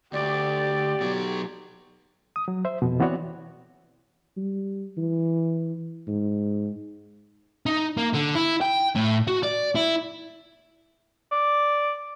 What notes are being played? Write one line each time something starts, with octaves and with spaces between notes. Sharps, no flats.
D2 G4 D5
B2 F#3
D#6
F#3
C5 E5
F2 B2
E3 B3 C4 F#4 C#5 D5
G3
E3
G#2
D#4
A#3
D3
E4
G5
A2
F#4
D5
E4
D5